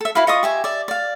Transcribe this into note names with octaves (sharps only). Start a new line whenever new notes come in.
A4 E5
E4 F#4 B4 F5
F4 D#5 C#6 D#6
G4 E5 G#5
D5 E5
D5 F5